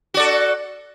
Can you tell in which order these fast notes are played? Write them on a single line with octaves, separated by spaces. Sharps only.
F#4 D5 A4